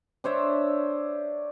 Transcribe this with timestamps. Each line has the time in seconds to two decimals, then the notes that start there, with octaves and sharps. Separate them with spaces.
0.24 D4 C5 C#5 E5